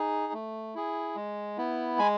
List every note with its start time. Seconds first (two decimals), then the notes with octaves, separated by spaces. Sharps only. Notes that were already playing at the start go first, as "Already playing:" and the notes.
Already playing: D#4 G#4
0.33 A3
0.75 E4 G#4
1.16 G#3
1.58 B3 E4
1.99 G#3 G#5 B5